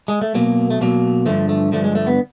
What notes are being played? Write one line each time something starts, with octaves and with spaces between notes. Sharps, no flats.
G#3
A3
B2 F#3 A#3
A3
B2 F#3 A#3
G2 D3 F3 A3
A3
G2 D3 F3 A3
G#3
A3
B3